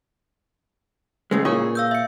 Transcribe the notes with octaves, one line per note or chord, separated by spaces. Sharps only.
A2 C#3 G#3 B4
A#2 F4 G#4 A#4 C#5
F5 E6 G6
E5 C#7